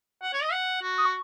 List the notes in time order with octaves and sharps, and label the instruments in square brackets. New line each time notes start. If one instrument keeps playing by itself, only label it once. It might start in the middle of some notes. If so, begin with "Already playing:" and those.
[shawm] F#5
C#5
D#5
F#5
F#4
[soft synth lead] D#6
C#6